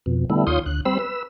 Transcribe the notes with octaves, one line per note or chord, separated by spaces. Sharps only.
F2 B2
D3 G3 A3 B3 E4
D#2 F4 C#5 C6 D#6 G6
D2 F#6
G3 C4 C5 B5 E6
B4 E6